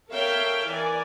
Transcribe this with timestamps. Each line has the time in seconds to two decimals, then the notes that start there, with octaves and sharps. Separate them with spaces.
0.10 A4 A#4 C#5 E5 F5 G5
0.67 E3 A#4 D5 G#5